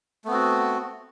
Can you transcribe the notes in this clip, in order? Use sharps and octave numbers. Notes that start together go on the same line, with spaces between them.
A3 B3 C4 F#4